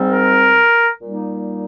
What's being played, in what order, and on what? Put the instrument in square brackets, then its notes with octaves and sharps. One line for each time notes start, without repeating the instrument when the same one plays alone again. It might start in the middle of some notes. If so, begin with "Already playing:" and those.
Already playing: [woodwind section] G#2 G3 C4
[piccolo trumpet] A#4
[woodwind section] A#2 G3 A#3 D#4